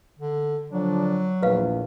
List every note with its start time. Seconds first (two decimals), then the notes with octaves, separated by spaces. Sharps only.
0.19 D3
0.72 D3 F3 F#3 D4
1.43 A#1 E2 B4 F5